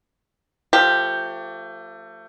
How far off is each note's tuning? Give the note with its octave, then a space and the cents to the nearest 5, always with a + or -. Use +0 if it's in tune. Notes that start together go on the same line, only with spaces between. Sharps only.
F3 +0 A3 +30 G4 +0